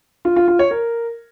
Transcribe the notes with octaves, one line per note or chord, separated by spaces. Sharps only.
F4
F4
F4
C#5
A#4